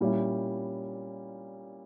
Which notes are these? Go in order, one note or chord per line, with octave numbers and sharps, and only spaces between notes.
A#2 G3 C#4 E4